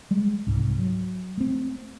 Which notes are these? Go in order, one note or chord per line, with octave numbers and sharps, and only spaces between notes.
G3 G#3
C2 G#2
F#3
A3 C4